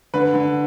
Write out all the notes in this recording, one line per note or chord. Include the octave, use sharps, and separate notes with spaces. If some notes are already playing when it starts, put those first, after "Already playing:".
D3 B4
D3